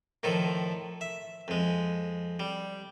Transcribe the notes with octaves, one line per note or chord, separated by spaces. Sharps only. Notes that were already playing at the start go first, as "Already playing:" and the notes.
A2 D#3 F3 A4
E5
F2 G#3
G3